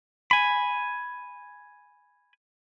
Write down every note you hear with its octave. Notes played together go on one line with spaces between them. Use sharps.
G#5 B5